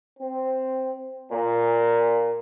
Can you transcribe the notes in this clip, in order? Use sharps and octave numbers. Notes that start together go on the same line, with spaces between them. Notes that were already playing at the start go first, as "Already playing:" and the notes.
C4
A#2